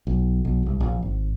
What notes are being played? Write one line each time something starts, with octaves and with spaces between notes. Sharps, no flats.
B1
B1
C2
A#1
G#1